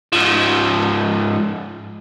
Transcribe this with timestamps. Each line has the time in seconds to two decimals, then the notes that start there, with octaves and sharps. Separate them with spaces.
0.13 G#2 F3